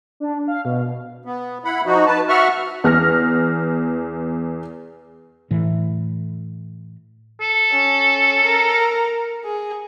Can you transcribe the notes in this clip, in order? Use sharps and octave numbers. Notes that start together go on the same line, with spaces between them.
D4
F5
B2
B3
E4 F#5 B5
F3 D#4 F#4
B4 A5
F#4 E5 F#5 C#6 F6
E2 F6 A#6
A2 E3
A4
C#4
A#4
G#4